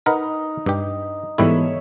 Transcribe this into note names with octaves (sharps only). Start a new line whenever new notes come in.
D#4 A#4 B4 F#5
G2 G4
G#2 E3 G3 B3 E4 A4 C#5 E5